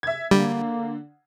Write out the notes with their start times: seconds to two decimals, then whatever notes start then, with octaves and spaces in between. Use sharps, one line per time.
0.03 E5 G#6
0.31 D3 G3 A#3